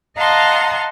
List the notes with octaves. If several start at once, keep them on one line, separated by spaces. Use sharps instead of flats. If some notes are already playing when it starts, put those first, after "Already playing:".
D#5 F5 F#5 A5 A#5 C6